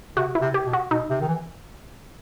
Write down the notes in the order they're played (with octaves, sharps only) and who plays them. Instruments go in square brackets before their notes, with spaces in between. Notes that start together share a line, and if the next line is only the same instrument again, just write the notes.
[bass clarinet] C3 [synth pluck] F#4
[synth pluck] E4
[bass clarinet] C3
[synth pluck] G4
[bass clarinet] B2
[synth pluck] F#4
[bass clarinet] B2 [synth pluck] D#4
[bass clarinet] C3
D#3
E3